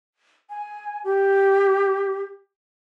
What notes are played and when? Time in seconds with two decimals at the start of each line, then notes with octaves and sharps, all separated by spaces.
0.50 G#5
1.04 G4